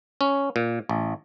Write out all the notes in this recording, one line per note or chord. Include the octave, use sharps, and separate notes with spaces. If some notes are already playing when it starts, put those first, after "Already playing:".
C#4
A#2
A1